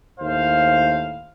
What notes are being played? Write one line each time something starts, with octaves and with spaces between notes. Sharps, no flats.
D#2 A2 C5 F5